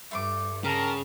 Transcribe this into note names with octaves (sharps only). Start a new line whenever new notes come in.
G2 A3 C6 D6
C#3 G4 A#4 A5